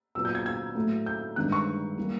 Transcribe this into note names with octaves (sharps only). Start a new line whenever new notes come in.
A#2 F#3 B3 E6
G6
G#6
G#6
A2 F#3 A3
G6
G2 D#3 G#3 F#6
C#6
E3 G3 A#3